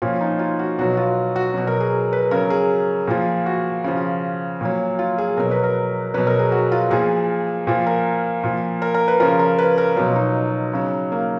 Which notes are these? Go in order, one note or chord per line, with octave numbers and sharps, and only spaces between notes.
A#2 F3 C#4
D#4
F4
F#4
B2 F#3 F#4
F4
F#4
B2 F#3
A#4
G#4
B4
C#3 F#3 A#4
G#4
A#2 F3
F#4
C#3 F3
A#2 F#3
F4
G#4
B2 F#3 A#4
B4
A#4
B2 F#3 B4
A#4
G#4
F#4
F4
A#2 F3 G#4
A#2 F3
A#4
A#2 F3
A#4
A#4
B4
C#3 F3 A#4
A#4
B4
A#4
B2 F#3 F4
D#4
C#3 F#3
A#3